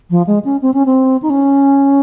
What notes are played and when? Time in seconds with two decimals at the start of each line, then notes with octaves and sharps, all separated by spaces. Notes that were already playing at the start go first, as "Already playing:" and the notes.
0.10 F3
0.27 G#3
0.45 C#4
0.62 C4
0.74 C#4
0.86 C4
1.22 D#4
1.30 C#4